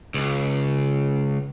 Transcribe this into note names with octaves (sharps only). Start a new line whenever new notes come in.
C#2